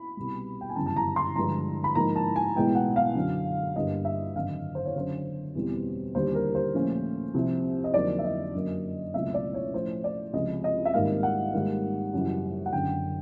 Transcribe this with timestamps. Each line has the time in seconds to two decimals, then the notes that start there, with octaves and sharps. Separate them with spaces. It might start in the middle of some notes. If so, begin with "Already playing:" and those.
Already playing: B5
0.17 C2 B2 G3
0.61 G5
0.70 G#5
0.76 G1 F#2 C#3 E3 G3 A5
0.86 A5
0.96 A#5
1.16 C6
1.36 G2 D3 F3 G#3 A#5
1.84 B5
1.95 G#2 F3 A#3 D#4 A#5
2.16 A5
2.36 G#5
2.56 B1 A2 E3 G#3 B3 G5
2.75 F#5
2.96 F5
3.15 F#2 D3 F#3
3.76 G1 G2 D3 G3 A#3 D#5
4.05 E5
4.35 G#1 F#2 D3 F5
4.75 C5
4.86 C#5
4.95 F#1 F#2 D3 C5
5.55 E2 B2 G3 C4
6.15 D#2 D3 G3 C5
6.35 A#4
6.55 C5
6.74 A#2 F3 A3 C#4 F4
7.34 C2 C3 F3
7.84 D#5
7.94 F2 D3 F#3 A#3 D#4 D5
8.19 E5
8.24 D#5
8.54 F#2 D3 F#3 A#3 C#4
9.14 C#2 B2 F#3 A3 C4 E5
9.34 D5
9.54 C#5
9.74 A2 F3 A3 C#4 C5
10.04 D5
10.33 C#2 C3 F3 D#5
10.64 D#5
10.85 E5
10.94 G#1 G#2 D#3 G3 A#3 F5
11.23 F#5
11.53 G#2 D#3 G3 A#3
12.13 F#2 C#3 E3 G3
12.66 F#5
12.73 F#1 F#2 D3 G5